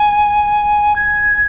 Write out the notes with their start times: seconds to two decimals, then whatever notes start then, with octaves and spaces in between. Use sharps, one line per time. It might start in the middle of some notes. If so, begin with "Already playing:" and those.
Already playing: G#5
0.96 G#6